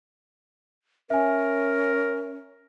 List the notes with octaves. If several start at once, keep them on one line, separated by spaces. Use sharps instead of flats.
C#4 A#4 E5 G#5